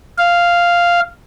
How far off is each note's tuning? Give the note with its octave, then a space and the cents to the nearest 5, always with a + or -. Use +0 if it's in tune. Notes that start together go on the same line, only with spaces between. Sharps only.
F5 -5